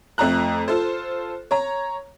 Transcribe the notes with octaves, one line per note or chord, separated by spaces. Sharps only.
F2 A3 A#5 F#6
F4 A4 C5
C#5 A#5